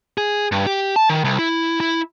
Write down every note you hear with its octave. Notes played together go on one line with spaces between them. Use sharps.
G#4
G2
G4
A5
D#3
C2
E4
E4